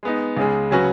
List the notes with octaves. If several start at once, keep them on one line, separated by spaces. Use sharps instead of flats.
G#3 B3 D#4
C#2 C#3 G#3
C#3 F#3 C#4 F#4 B4